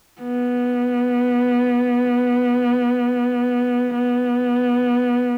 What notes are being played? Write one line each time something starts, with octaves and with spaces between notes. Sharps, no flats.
B3
B3